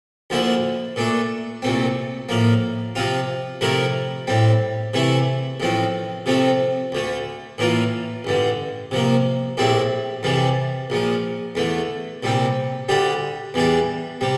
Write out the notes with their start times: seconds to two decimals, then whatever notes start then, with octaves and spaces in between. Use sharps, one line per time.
0.30 D2 D3 F3 A#3 E4
0.96 A#2 A3 D4
1.62 C2 A#2 A3 C4
2.29 A2 F3 A#3
2.95 C3 F3 C4 F4
3.61 C3 F3 A3 E4 A#4
4.27 A2 G3 C4
4.94 C3 E3 A3 E4
5.60 A1 A2 F3 C4
6.26 C3 F3 A3 C4
6.92 D2 D3 A3
7.58 A2 E3 A#3 F4
8.25 A1 G2 D3
8.91 C3 F3 A#3
9.57 A#1 A2 G3 C4 E4
10.23 F2 C3 E3 G3
10.90 A#1 A#2 F3
11.55 E2 D3 A3
12.23 C2 A#2 G3 C4
12.89 D2 D3 G3 D4 G4
13.54 E2 E3 G3 D4
14.21 C3 G3